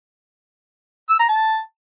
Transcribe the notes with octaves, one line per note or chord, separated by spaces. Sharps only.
E6
A#5
A5